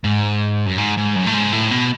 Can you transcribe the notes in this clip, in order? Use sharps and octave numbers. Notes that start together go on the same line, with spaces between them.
G#2
F#2
G#2
G#2
F#2
A2
G#2
A2
B2